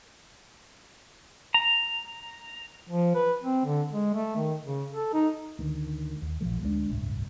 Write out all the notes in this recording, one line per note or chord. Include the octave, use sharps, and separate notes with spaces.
A#5
F3
B4
C4
D3
G#3
A3
D#3
C#3
A4
D#4
D2 D#3
D#2
A#1 D#2 F3 A3
D2 G#3 A#3 D4
D1 G1 C2 A2